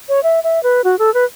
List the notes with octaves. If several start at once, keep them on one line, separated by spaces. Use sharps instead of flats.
C#5
E5
E5
B4
F#4
A4
B4